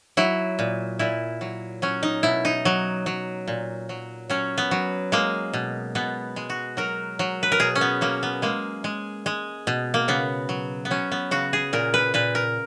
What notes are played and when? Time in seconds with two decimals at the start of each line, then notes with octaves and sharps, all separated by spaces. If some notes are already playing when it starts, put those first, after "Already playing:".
0.17 F#3 E4
0.59 A#2
0.99 A#2 E4
1.41 F#3
1.82 F#3 C#4
2.03 D#4
2.23 B2 E4
2.45 D#4
2.65 F#3
3.06 F#3
3.48 A#2
3.89 F#3
4.30 F#3 C#4
4.58 B3
4.71 F#3
5.12 G#3 A#3
5.53 B2
5.95 B2 B3
6.36 G#3
6.49 F#4
6.77 F#3 A#4
7.19 F#3
7.43 B4
7.52 A#4
7.60 B2 G#4
7.75 C#4
7.81 B3
8.01 F#3 A#3
8.23 B3
8.42 G#3 A#3
8.84 G#3
9.26 G#3
9.67 B2
9.94 A#3
10.08 C#3 B3
10.49 F#3
10.85 B3
10.90 F#3 C#4
11.12 B3
11.31 C#3 F#4
11.53 G#4
11.73 A#2 A#4
11.94 B4
12.14 A#2 B4
12.35 A#4